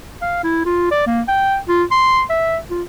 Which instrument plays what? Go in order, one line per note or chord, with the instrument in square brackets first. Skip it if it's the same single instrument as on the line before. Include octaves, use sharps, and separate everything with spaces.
[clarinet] F5
E4
F4
D5
A#3
G5
F4
C6
E5
F4